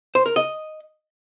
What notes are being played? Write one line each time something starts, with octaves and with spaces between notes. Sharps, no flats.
C5
A#4
D#5